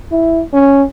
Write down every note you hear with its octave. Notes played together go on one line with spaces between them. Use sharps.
E4
C#4